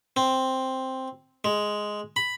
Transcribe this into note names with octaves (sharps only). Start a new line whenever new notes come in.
C4
G#3
B5